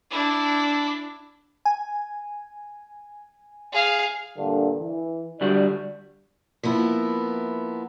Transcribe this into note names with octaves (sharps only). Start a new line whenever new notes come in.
D4 E4
G#5
G#4 F5
G2 A#2 D3
E3
D3 G3 F#4 D5
F3 A#3 B3 E4